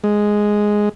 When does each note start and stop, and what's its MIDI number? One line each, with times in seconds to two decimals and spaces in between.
0.04 0.89 56